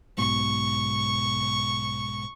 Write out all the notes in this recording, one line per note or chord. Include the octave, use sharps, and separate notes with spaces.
B1 G#2 B2 C#6